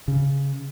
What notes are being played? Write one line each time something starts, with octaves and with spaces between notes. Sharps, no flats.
C#3